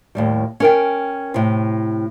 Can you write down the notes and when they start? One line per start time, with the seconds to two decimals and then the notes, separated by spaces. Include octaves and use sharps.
0.15 D#2 A2 G3
0.60 C#4 A#4 G5
1.34 A2 C3